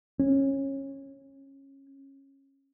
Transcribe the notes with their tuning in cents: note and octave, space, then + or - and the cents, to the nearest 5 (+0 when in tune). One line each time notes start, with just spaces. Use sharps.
C#4 -20